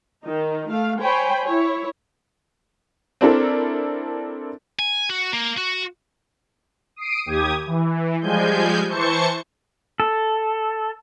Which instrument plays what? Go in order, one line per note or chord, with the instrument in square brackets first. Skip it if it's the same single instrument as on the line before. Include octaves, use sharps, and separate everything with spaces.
[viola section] D#3 D#4
A3 F5
C5 C#5 G5 G#5 B5
E4 C#5
[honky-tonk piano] C4 D4 E4 A4 A#4
[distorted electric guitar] G#5
F#4
A#3
F#4
[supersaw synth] D#6 C7 D7 D#7
D#2 G4 D#6 G#6
E3
F3 G3 G#3 G#5 G6
E3 C5 A5 C#6 C#7
[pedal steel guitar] A4